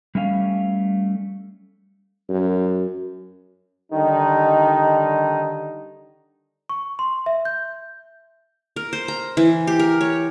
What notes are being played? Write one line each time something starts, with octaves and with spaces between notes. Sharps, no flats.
G3 A3 C#4 E5 F5
F#2
D3 D#3 G3 D#4
C#6
C6
E5
G6
A#4
C5
A#5
E3
G4
A#4
C#5